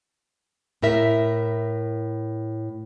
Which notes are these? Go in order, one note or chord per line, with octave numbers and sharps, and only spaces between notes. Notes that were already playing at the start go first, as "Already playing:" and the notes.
A2 E4 A#4 E5